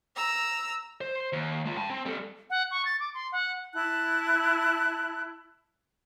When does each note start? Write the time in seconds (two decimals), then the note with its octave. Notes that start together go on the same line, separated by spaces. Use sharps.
0.16 A#5 E6
1.01 C5
1.33 D#2
1.65 G#3 F4
1.77 G5 A5
1.90 C4
2.06 G3 A4
2.50 F#5
2.71 C#6
2.85 A6
3.00 D6
3.14 C6
3.32 F#5
3.74 E4 A5 F#6